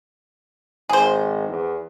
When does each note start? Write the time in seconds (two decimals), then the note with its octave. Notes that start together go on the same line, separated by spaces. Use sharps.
0.89 G#1 G#4 C5
1.49 E2